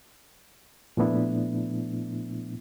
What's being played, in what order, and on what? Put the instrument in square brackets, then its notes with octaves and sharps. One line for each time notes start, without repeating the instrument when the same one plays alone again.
[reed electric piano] A#2 F3 A3 B3 D4 E4